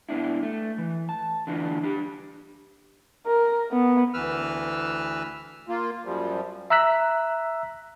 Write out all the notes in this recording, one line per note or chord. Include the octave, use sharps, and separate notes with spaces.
B3 D4 E4
A3
E3
A5
D3 E3 D4 F4 F#4
D4 G4
A#4
B3
D2 E3 B4 E6 F6
A#3 F4
F#2 F3 G3
E5 A#5 E6 F#6 B6